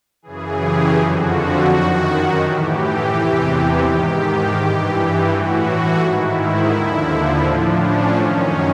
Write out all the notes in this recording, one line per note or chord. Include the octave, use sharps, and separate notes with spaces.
F#2 C#3 E3 G#4
G4
F2 D3 F3 F#4
F#2 D#3
A2 E3 G4
E2 C3 E3
G#2 D#3 G4
G2 E3
A2 E3 F#4
G#2 D#3 E4
D#2 D3 F3
A2 F3 D4
C#4
F#2 D#3 C#4